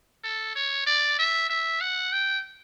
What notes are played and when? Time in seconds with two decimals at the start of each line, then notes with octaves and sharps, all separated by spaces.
0.24 A4
0.56 C#5
0.86 D5
1.19 E5
1.50 E5
1.81 F#5
2.13 G5